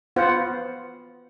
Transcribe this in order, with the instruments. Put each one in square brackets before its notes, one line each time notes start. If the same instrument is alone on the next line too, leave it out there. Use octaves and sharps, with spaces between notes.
[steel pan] B3 F4 C5 F#5